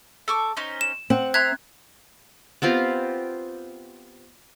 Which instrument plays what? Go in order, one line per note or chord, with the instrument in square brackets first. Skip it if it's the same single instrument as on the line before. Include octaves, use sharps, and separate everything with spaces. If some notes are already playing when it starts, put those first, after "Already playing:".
[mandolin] A4 C#6 D6
C#4 D#4 C5
[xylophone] E7
[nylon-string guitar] C4 [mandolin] F#5
[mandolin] E5 A#5 C6 [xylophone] F#6 G#6
[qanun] B3 C4 F4 G4